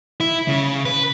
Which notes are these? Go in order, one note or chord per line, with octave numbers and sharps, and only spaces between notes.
E4
C#3
B4